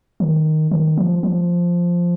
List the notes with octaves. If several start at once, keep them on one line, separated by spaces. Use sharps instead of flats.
D#3
D#3
F3
F3